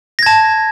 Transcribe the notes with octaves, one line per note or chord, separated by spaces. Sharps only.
A5 G#6 A#6